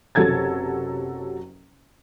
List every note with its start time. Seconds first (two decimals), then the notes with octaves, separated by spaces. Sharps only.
0.15 F#1 C3 F#3 A4 G#6 A6